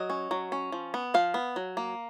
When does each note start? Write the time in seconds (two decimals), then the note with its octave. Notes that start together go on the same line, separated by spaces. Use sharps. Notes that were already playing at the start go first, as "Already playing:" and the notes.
Already playing: F#3 D#5
0.10 C#4
0.31 F#3
0.52 C#4
0.72 F3
0.94 B3
1.14 F3 F5
1.34 B3
1.56 F#3
1.77 A#3